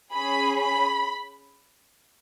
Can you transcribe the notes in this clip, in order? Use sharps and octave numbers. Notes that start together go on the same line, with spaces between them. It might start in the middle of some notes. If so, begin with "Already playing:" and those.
C#4 G#4 B5
B5